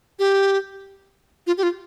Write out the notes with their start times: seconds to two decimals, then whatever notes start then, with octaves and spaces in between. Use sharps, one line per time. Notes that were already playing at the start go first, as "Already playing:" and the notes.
0.19 G4
1.47 F4
1.58 G4
1.63 F4